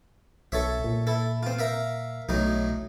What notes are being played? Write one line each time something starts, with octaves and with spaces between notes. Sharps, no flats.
B1 A4 C#5 E5
A#2
E4 A4
C4 F4
A#4 E5 F5
B1 A2 F#3 D#4